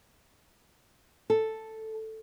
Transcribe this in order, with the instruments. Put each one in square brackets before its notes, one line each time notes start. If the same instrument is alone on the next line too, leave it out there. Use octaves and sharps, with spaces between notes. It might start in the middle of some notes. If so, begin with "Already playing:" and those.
[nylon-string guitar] A4